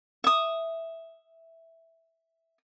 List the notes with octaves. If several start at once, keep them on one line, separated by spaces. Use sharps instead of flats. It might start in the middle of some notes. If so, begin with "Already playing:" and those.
E5 D#6